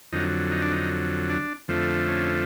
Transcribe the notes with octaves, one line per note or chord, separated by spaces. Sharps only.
F2 D3 F#3 D#4
D#4
D4
D#4
D4
F2 D3 F3 A3
C#4